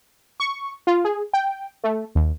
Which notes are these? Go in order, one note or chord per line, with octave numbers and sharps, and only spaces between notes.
C#6
F4
G#4
G5
A3
D#2